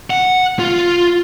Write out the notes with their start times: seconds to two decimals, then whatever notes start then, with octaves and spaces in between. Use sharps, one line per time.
0.10 F#5
0.59 F4